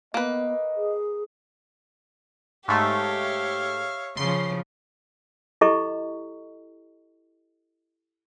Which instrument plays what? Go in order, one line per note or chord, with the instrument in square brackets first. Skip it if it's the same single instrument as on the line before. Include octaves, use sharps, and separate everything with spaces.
[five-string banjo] A#3 B4 [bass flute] B3 [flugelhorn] D#5
[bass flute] G#4
[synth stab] G#2 A3 [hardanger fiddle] G4 [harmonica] C#5 E5 F5
[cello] C#3 F3 [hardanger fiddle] C#4 [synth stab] C6 C7
[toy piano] E4 G4 A4 D#5 A#5 C#6